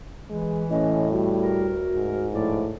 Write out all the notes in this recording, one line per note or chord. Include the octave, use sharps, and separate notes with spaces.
E3 G#3
A2 C#4 D#5
G3 F#4
D2 A#4
G#2
A2 F3 D5